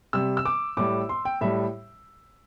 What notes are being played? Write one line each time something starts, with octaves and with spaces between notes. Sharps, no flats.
C3 G3 E6
E6
D6
A2 G3 D6
C6
G5
A2 G3 E5